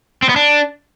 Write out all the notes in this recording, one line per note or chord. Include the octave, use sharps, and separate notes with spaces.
C4
B3
D4